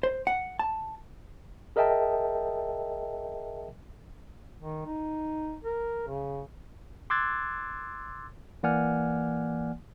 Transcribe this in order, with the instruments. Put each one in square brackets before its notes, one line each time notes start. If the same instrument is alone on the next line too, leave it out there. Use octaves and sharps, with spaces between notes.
[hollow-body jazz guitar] C5
F#5
A5
[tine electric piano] G#4 A#4 D#5 E5 G5 A5
[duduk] D#3
D#4
A#4
C#3
[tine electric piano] C6 D6 E6 F#6 G#6 A6
E3 A#3 D5 F#5 G#5 F6